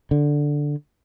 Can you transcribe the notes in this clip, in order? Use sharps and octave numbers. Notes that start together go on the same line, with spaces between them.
D3